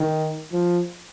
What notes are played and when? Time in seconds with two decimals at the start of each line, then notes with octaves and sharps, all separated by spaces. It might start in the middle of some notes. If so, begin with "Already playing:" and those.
Already playing: D#3
0.52 F3